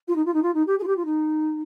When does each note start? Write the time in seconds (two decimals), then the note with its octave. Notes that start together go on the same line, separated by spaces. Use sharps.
0.08 F4
0.15 D#4
0.25 F4
0.34 D#4
0.42 F4
0.54 D#4
0.67 G4
0.79 G#4
0.83 F4
0.87 G4
0.96 F4
1.05 D#4